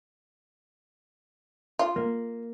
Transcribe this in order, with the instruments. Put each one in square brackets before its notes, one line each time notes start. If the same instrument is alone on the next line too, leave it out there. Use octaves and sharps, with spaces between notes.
[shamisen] F4
[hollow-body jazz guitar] A#3